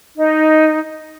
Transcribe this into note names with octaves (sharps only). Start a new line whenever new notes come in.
D#4